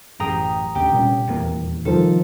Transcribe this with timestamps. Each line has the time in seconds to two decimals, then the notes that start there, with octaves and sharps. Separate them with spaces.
0.20 A1 F#2 G4 G#4 G5 A#5 D#6
0.75 D#2 C#3 G4 G5
0.93 C2 A#2 C#4
1.28 D#1 E2 A#3
1.85 C2 D#3 F3 A4